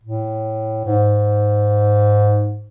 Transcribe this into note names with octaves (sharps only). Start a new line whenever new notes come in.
A2
G#2